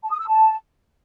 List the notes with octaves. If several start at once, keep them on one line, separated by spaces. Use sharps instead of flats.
A5
D#6
E6
A5